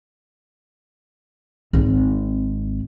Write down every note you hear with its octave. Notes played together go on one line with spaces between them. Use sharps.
G#1 C4